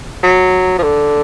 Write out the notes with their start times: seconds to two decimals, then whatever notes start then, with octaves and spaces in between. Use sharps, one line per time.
0.23 F#3
0.78 F3
0.83 D3